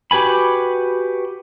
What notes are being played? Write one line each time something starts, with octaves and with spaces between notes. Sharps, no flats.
F#4 G4 B4 G#5 B5